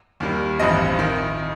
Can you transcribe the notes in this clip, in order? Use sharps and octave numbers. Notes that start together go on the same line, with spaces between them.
D#2 D#3 G3
A1 G2 F3 C4 D#5
D#3